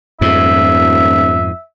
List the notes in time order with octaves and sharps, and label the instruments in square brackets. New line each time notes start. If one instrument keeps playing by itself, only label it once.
[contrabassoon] D#1 [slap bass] F2 G#2 [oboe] E5